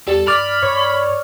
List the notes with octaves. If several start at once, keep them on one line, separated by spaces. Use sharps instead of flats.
E2 G3 A4
G2 D5 B5 F6
G2 C#5